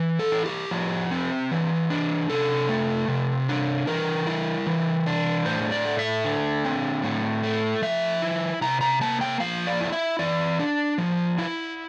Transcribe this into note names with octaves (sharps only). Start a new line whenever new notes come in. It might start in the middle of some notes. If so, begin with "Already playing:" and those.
Already playing: E3
A4
E4
G4
F3
C4
E3
D4
C3 A4
A3
C3
D4
E3 A#4
E4
E3
D4
A2 C5
D5
A3
E5
D3
C4
A2
A3
F3 E5
E4
C3 A#5
A#5
A#3 A5
G5
F3 F5
D5
E4
E5
E3 D5
D4
F3
E4